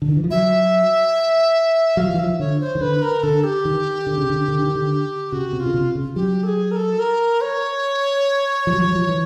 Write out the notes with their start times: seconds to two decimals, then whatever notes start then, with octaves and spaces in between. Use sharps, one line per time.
0.02 D3
0.09 D#3
0.17 E3
0.24 F3
0.31 F#3 E5
1.97 F#3 F5
2.06 F3
2.14 E3
2.19 F3 E5
2.39 D3 C#5
2.61 C5
2.75 D#3
2.81 D3 B4
3.02 A#4
3.23 D3 A4
3.44 G4
3.65 D#3
4.07 D3
4.18 C#3
4.30 D3
4.48 D3
4.62 D#3
4.75 D3
5.32 C#3 F#4
5.53 C3
5.60 F4
5.66 C#3
5.74 C3
5.95 C#3
6.16 F#3 G4
6.43 A4
6.47 G#4
6.71 A#4
6.76 A4
6.99 A#4
7.41 C#5
8.67 F3
8.73 F#3
8.81 F3
8.88 F#3
8.96 F3
9.09 E3